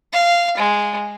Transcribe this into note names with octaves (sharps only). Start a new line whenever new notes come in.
F5
G#3